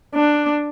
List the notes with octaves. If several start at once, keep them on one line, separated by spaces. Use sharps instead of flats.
D4